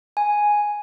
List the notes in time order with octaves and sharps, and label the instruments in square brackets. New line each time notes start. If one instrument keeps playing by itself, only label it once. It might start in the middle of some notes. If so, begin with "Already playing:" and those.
[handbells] G#5